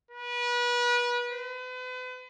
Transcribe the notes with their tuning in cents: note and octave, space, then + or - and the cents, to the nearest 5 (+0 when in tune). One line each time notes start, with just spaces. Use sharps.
B4 -30
B4 +40